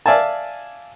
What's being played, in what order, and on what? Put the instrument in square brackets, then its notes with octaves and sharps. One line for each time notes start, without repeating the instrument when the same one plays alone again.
[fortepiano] D5 E5 F5 G#5 A5